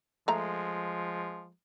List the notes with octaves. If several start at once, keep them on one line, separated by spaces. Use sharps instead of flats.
F3 G#3 A3 A#5